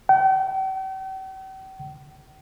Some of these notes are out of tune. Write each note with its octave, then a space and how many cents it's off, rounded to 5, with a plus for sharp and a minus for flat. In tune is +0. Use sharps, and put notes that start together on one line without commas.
G5 -45